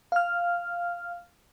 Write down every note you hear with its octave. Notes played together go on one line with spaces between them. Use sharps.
F5 F6